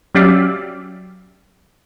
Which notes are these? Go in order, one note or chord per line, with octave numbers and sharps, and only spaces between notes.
F#3 C#4 G4 D5 E5 F5